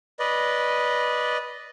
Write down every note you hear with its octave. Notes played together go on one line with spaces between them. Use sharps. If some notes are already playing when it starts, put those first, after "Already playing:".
B4 D5 D#5